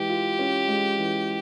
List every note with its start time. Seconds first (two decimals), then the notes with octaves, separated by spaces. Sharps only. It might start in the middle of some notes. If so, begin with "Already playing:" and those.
Already playing: E3 G#3 G4
0.09 F4
0.39 C#4
0.68 G#3
0.98 E3